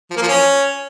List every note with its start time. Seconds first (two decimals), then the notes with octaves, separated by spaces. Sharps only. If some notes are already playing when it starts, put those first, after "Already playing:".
0.11 F3
0.16 A#3
0.22 F3
0.28 C#4